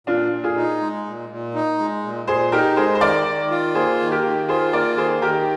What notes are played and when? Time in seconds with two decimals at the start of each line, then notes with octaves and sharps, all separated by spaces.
0.07 A#2 D4 F4
0.32 A#2
0.44 F4 G#4
0.56 D#4
0.81 G#3
1.06 A#2
1.29 A#2
1.55 D#4
1.79 G#3
2.03 A#2
2.27 A#2 G#4 C5
2.52 D#4 G4 A#4
2.76 G#3 G#4 C5
2.95 C5
3.01 D#3 A#4 D5
3.27 D#3
3.50 F4
3.75 A#3 G#4 C5
4.00 D#3
4.11 G4 A#4
4.24 D#3
4.49 F4 G#4 C5
4.73 A#3 A#4 D5
4.97 D#3 G#4 C5
5.22 D#3 G4 A#4